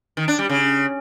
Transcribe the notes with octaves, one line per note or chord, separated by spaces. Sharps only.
D#3
D4
G3
C#3